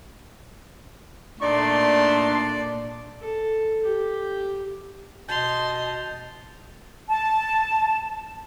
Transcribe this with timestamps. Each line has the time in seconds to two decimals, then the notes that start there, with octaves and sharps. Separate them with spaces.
1.42 A#2 A3 D4 D#4 D5 C6
3.20 A4
3.83 G4
5.29 B2 D#5 A5 C6 G6 A6 F7
7.08 A5